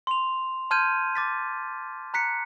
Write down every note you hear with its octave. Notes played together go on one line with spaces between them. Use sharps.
C6 F7
A5 C6 F6 G6 G#6 D#7
D6 A6 B6
A#5 F#6 B6 C#7